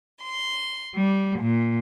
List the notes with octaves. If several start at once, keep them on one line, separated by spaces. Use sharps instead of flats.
C6
G3
A#2